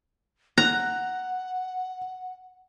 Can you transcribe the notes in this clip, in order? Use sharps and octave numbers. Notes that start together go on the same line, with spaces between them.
F#5 A#5 F#6